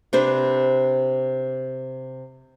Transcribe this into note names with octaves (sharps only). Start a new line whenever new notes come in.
C3 D4 B4 C5